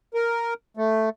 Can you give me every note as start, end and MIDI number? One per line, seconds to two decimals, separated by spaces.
0.14 0.54 70
0.77 1.09 57